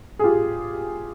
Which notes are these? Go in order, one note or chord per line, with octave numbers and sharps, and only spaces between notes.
G#4
F4 G4